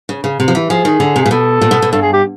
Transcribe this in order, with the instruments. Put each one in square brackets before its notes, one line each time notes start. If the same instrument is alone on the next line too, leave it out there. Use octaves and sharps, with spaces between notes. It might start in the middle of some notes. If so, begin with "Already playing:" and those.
[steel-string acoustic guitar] C#3
C#3
C3
F3
E3
[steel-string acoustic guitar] F3 [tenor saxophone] G#4
[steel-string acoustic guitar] D#3
D3
C3
[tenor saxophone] G#4
[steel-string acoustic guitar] A#2
[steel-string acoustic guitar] B2 [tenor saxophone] A4
[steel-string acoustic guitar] A#2
B2
B2
[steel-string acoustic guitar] G2 [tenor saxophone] A4
[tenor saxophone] G#4
G4